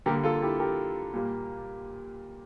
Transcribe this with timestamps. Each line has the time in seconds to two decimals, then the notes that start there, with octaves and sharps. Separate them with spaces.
0.06 D3 G3 A#3 G4 A#4
0.23 F4 A4
0.42 E4 G4
0.60 G4 A#4
1.14 A#2 G3 A#3